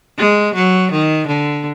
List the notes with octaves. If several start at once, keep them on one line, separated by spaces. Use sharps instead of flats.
G#3
F#3
D#3
D3